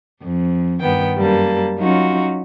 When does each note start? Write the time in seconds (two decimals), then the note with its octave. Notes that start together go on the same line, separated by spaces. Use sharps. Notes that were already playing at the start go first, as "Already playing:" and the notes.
0.23 F2
0.81 G2 D#3 B3 G5
1.18 F#2 G3 A#3 A5
1.79 F#3 C#4 D#4 F4 F#4